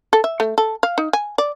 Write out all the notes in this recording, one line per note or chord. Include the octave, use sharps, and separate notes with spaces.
A4
E5
A3
A4
F5
D#4
G#5
D5